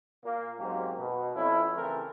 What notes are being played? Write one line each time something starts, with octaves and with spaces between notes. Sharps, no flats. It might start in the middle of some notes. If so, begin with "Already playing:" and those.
A#2 A#3
G#2 F#3 A#3 C4 C#4 G4
B2
F2 C#4 E4
C#3 E3 A3 C4 A4 A#4